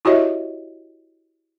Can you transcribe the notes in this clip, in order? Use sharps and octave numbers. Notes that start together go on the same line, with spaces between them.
E4 F#4 G4 C#5 D#5 E5